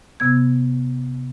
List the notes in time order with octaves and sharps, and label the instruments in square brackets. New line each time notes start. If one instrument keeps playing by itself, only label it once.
[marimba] C3 B3 G#6